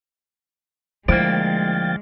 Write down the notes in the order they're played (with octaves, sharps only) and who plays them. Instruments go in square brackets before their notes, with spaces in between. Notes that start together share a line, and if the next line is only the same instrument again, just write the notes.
[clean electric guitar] D2 A#3 [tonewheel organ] F3 G5 A6 [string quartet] G#3 [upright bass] E4